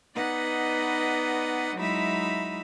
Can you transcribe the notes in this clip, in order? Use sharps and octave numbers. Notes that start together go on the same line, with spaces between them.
B3 D#4 B4 D5 D#5 F#5
F#3 G#3 D#4 E4 E5 B5